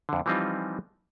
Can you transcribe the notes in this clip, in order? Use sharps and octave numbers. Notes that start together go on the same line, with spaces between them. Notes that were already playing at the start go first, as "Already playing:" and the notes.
F2 D3
E3 F3 G3 C4 D#4 F4